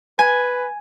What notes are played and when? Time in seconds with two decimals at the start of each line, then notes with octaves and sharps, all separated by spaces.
0.19 B4 G#5